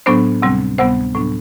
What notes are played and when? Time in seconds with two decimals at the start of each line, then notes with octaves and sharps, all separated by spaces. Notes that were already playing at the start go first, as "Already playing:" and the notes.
0.06 A2 F#3 B3 D4 C5
0.42 D2 C3 G3 C4
0.78 D2 C3 G3 B3 C5
1.15 A2 F#3 B3 D4